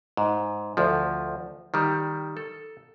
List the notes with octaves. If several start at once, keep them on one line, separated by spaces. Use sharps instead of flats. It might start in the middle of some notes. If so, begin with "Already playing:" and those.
G#2
D2 F3
D#3 G3
A4